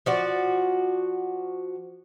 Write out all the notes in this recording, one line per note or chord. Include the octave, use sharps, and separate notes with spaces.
F3 F#4 D5